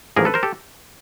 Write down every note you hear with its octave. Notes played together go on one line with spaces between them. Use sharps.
A1 G#2 F3 G#4 A#4
A4 B4
A#4 C5
G4 A4